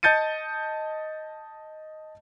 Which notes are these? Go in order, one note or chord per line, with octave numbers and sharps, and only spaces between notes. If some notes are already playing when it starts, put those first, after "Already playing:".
D#5 A5 G6 A6 C#7 D#7